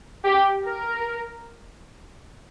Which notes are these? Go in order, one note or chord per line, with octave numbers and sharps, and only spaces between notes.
G4
A#4